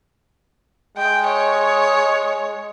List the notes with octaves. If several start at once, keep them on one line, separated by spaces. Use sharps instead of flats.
G#3 G5
C#5